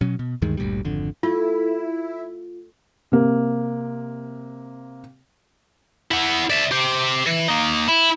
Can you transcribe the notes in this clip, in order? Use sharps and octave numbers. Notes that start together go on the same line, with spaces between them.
B2 F#3 C#4
B2
D2 G2 D#3 G#3
G1 D2 A#2 G3
G#1 F2 D3
A3 E4 F4
C3 A#3
E4 F#5
D5 E5
G4 C5
E3
A#3 D#4
E4